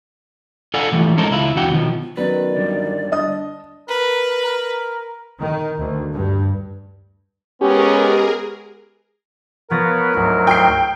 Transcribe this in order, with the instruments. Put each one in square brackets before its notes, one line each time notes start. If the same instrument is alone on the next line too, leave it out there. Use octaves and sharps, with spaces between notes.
[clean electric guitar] A4 D5 F5 F#5 G#5
E3 F3 G3 A3
G#3 C#4 D#4 A4 A#4 C5
C#2 E4 F4
E2 D3 F#4 F#5 G5
B2 D#3 F3
[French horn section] D#3 [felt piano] F#3 B3 C#4 [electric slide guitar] B4 [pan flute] D5
[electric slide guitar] D3 G3
[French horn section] D4 [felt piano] D#5 D#6
[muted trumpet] A#4 [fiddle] B4
[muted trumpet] A#4
[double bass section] D#3
D2
G2
[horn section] G#3 B3 [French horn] C#4 [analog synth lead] G4 [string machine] G#4 A#4
[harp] F3 A6 A#6 [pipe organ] B3 B4 C#5 [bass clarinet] A#4
[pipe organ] D2 G#2 F#3
[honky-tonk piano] G5 C7